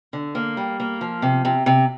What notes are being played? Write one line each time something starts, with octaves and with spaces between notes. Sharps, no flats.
D3
A#3
G3
A#3
F3
C3
C3
C3